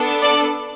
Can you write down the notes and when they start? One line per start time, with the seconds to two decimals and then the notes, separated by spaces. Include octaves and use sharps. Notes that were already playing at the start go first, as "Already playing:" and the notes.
Already playing: B3 D4 A4
0.23 D5